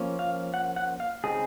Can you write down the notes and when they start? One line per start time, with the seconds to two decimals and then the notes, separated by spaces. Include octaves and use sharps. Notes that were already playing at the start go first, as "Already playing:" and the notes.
Already playing: F3 A#3 C#4
0.19 F5
0.54 F#5
0.76 F#5
1.00 F5
1.24 C#3 G#3 C4 D#4 G#4